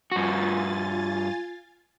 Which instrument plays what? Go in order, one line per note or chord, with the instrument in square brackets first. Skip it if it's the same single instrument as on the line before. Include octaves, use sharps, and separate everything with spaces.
[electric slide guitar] G2 F#4 [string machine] F4 G#5 A6